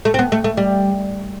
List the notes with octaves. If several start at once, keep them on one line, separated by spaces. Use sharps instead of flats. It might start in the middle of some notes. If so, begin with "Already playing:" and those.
A3
C4
B3
A3
A3
G3